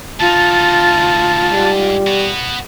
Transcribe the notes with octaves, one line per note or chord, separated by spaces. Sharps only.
D2 D#4 F4 A5
G#2 G3
B3 F#4